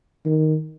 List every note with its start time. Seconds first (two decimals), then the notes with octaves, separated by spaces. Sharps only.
0.26 D#3